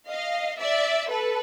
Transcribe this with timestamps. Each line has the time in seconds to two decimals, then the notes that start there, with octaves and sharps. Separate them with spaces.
0.08 D#5 F5
0.58 D5 E5
1.09 A4 B4